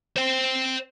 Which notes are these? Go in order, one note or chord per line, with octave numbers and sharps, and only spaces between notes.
C5 G5